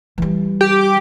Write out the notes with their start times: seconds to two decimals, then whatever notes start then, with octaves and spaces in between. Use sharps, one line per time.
0.18 E3 G3
0.61 G4